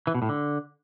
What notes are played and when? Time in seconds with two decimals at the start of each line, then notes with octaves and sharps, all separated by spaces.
0.07 E3
0.14 B2
0.22 A2
0.29 D3